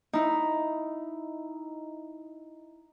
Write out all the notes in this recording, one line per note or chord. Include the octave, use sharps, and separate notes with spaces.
D#4 E4